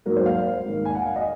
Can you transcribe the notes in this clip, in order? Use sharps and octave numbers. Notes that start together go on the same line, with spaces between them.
G#2 F#3 A#3 A#4
C5
F5
G#2 D#3 A#3
G#5
F#5
F5
D#5